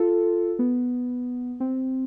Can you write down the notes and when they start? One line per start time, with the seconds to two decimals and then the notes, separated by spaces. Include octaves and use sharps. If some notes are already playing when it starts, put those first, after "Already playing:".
Already playing: F4 A4
0.59 B3
1.60 C4